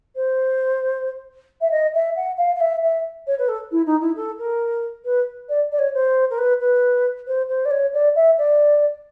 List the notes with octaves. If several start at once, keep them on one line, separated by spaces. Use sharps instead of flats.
C5
E5
D#5
E5
F#5
F5
F5
E5
E5
C#5
B4
A4
E4
D#4
E4
A4
A#4
B4
D5
D5
C#5
C5
A#4
B4
B4
C5
C5
D5
C#5
D5
E5
D5